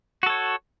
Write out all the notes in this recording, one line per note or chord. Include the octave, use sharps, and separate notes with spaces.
F#4 A4 C#5